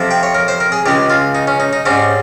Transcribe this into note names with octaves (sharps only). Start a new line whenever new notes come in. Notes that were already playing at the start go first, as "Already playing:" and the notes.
Already playing: F2 C3 F3 C4
G5
C#5
A#4
C5
A#4
G#4
C#2 C#3 G#3 G4
F4
D#4
C#4
D#4
D#4
G#2 G3 C4 C#4